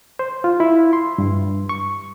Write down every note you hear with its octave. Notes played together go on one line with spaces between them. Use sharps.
C5
F4
E4
C6
G2
C#6